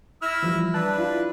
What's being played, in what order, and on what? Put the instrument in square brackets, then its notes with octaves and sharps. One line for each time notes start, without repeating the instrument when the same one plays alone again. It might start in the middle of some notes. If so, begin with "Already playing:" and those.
[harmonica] E4 E6 [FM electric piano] F6 A#6
[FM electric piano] E3 F3 G3
[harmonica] D4 B4 [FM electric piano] A5 F#6
[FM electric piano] E4 F4